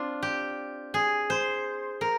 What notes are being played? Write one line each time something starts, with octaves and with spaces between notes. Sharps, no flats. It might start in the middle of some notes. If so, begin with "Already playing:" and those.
Already playing: C4 D4 F4
G4
G#4
C5
A#4